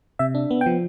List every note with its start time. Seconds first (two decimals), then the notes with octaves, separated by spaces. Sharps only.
0.19 C3 E5
0.35 D4
0.51 B3
0.61 G5
0.66 F3